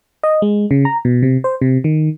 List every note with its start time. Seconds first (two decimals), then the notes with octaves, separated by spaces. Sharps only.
0.23 D#5
0.42 G#3
0.71 C#3
0.85 A#5
1.05 B2
1.23 C3
1.44 C5
1.62 C3
1.84 D#3